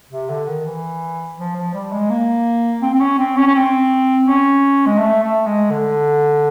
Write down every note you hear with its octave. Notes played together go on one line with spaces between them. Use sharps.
C3
D3
D#3
E3
F3
F3
G3
G#3
A#3
C4
C4
C#4
C4
C#4
C#4
C4
C#4
G#3
A3
A3
G#3
D3